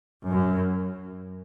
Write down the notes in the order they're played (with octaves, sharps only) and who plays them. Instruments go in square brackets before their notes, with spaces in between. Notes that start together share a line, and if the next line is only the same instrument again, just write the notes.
[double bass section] F#2